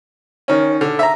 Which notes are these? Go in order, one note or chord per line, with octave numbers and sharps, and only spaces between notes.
D#3 C#4
D3
E5 A#5